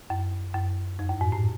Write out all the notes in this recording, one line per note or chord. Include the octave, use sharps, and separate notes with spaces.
F#2
F#2
F2
F#2
G#2
A2